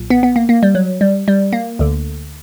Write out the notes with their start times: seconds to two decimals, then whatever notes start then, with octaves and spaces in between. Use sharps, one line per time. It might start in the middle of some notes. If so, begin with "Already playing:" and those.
Already playing: B1 A#2
0.10 B3
0.23 B3
0.36 A#3
0.49 A#3
0.63 G3
0.75 F#3
1.01 G3
1.28 G3
1.53 A#3
1.79 D2 D3